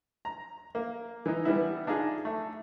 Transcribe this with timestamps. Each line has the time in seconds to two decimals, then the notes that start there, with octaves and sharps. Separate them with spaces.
0.25 A#5
0.75 A#3
1.26 E3 D#4
1.45 E3 G3 B3 E4
1.87 D4 D#4 F4 G#4
2.25 A3